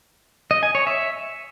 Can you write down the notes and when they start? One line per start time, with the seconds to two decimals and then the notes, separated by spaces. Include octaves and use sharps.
0.51 D#5
0.63 G#5
0.75 C#5
0.87 E5